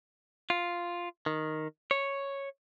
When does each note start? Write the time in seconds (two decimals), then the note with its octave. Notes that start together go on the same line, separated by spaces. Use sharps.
0.50 F4
1.26 D#3
1.91 C#5